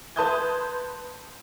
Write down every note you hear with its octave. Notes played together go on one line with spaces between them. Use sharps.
B4 A5 C6 D#6 G6 G#6